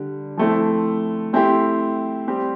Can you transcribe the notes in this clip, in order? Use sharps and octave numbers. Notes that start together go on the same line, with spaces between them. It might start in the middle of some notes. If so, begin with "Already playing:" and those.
Already playing: D3 G3
F3 A3 C4 E4
A3 C4 E4 G4 C5
G3 C4 G4